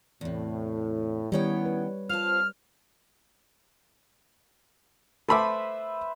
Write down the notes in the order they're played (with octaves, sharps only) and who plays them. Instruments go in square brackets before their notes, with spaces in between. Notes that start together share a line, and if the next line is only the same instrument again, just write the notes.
[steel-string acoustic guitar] E2 C3 [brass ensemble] A2
[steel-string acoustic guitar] D#3 C#4 G5 [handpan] G3 C#5 [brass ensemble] B3 E4
[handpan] B4
[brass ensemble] C4 F4 C5 [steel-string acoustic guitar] F5 A5 [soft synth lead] F6
[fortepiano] A3 B5 D6 [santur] B4 C5 E5